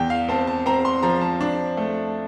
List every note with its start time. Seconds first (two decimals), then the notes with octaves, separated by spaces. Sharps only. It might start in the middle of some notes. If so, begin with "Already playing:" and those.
Already playing: E2 G5
0.10 F5
0.29 C4 A5
0.47 A5
0.66 C4 A#5
0.85 C6
1.03 F3 A#5
1.21 A5
1.41 D4
1.77 A3